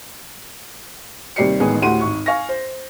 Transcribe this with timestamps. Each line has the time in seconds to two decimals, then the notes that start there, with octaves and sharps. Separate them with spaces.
1.36 D#2 C3 G3 D5 C7 C#7
1.60 A1 D#3 G#3 B3 G#4
1.82 D2 A2 G4 F#5 C6 D#7
2.01 G#1 C#6
2.26 F5 G#5 C#6 A#6
2.49 C5